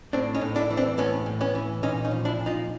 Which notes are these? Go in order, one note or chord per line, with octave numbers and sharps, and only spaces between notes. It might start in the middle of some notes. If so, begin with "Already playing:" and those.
A2 C4 D4
C#4 D#4
A2
D4 E4
E3
C4 D4
A2 B3 C#4
A2
B3 C#4
E3
A#2 C#4 D#4
C#4 D#4
F3
D4 E4
A#2
D#4 F4